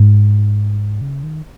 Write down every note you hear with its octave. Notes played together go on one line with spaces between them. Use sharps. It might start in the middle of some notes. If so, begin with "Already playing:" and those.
Already playing: G#2
C#3
D#3